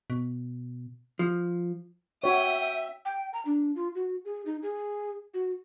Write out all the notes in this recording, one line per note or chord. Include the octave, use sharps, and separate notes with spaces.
B2
F3
F#4 C#5 E5 G5 D#6
G5
A#5
D4
F4
F#4
G#4
D#4
G#4
F#4